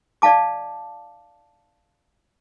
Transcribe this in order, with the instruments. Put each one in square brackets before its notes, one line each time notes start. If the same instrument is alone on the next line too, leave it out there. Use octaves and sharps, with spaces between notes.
[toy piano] D5 D#5 F5 A5 D6